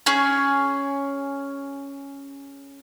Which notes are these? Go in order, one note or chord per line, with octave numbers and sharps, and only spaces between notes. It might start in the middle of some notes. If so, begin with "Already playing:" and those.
C#4 G#4